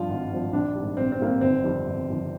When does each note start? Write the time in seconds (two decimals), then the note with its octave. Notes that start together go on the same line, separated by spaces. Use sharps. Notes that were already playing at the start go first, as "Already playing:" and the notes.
Already playing: G2 F3 F4
0.09 G#1
0.31 G2 F3
0.53 A#1 D4
0.75 G#2 D#3 G3
0.97 A#1 C4
1.12 C4
1.19 G#2 D#3 G3 A#3
1.27 C4
1.41 G1 C4
1.63 F2 D#3 G3
1.86 G1
2.07 F2 D#3 G3